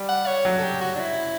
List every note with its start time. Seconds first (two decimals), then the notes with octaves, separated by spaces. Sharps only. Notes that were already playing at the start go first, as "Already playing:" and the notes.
Already playing: G3
0.09 F#5
0.26 C#5
0.45 F#3
0.58 A4
0.64 G4
0.81 F#4
0.96 D4
1.00 E4